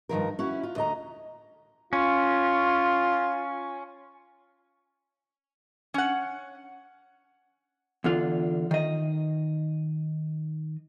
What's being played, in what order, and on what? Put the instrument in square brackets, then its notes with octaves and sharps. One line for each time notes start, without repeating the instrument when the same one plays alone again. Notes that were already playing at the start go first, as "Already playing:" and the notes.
[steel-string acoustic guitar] G2 D#3 F3 A#4
C#4 E4 F#4
F4
D2 D#5 A#5
[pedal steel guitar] C#4 [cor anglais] F4
[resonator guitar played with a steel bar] C#4 F#5
[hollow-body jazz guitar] E2 D3 F4
D#3 D#5